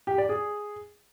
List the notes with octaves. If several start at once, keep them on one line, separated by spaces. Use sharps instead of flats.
G4
D5
G#4